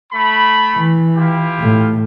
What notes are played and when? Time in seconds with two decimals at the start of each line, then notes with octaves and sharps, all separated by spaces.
0.12 A3 B5
0.76 E3
1.16 E4 F4 G4
1.60 A2